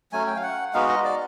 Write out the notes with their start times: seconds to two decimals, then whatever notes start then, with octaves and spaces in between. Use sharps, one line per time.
0.12 F#3 A3 C#4 G#5
0.27 G5
0.36 F5
0.43 F#5
0.73 G#3 B3 D#4 F#4 F5
0.89 D#5
1.05 D5